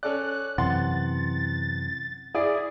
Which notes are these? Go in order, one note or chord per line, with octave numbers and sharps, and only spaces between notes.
C#4 A4 D5 F#6
F#2 C3 E3 F#5 C6 A6
E4 G#4 D5